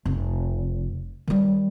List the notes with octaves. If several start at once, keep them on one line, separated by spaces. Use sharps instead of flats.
F1
D#3 G3